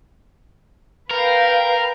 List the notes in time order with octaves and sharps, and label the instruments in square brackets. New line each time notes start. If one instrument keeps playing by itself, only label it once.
[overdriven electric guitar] A#4 [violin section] B4 F5 G5